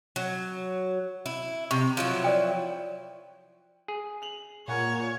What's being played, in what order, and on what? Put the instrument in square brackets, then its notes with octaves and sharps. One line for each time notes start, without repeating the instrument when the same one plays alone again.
[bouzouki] F#3
E4
[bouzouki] C3 [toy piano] C#6
[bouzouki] F3 F#3 E4
[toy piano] C#5 D5 G5
[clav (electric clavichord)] G#4
[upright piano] F7 F#7
[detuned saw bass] A#2 [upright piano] A#4 F#5 G#5 [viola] C#5